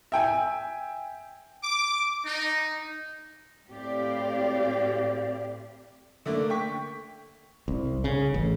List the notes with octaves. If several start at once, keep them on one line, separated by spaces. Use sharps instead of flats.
E5 G5 G#5
D6
D#4
A2 C4 G4 D5 F5
D3 A3 A#3
G5 C#6 B6
C2
C#3
A1